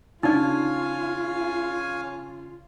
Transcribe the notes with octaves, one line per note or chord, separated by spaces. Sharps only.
C#3 D4 D#4 F4 C#5 D5 F5 G#5